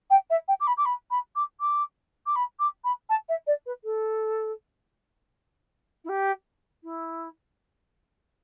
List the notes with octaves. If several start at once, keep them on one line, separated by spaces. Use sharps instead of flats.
G5
E5
G5
D6
B5
D6
B5
B5
D6
D6
D6
B5
D6
B5
A5
E5
D5
B4
A4
E4
G4
E4